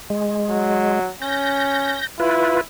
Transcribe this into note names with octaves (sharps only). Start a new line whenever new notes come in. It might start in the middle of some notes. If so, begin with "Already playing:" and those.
G#3
F#3
C#4 G6 A#6
E4 F4 B4